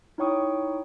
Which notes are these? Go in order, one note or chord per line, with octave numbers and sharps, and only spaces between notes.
D#4 E4 C#5 G5 C#6 D#6